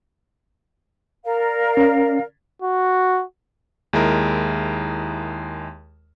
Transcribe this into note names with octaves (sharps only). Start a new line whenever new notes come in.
A#4 D5 F5
C#4
F#4
D#2 G#3 E4 A#4